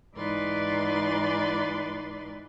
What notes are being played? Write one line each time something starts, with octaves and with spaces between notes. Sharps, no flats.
G#2 E3 D#4 B4 D5 C6